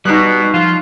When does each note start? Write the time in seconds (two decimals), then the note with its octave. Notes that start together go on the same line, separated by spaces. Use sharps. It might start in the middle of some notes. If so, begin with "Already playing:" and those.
0.05 B2 G3 D#4 F#6
0.54 F3 F4